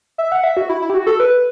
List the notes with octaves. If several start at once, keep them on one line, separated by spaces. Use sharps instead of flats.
E5
F#5
E5
F#4
E4
E4
G4
F#4
A4
B4